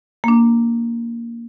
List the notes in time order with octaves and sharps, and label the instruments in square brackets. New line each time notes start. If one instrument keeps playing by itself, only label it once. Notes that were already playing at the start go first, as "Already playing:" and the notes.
[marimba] A#3 D4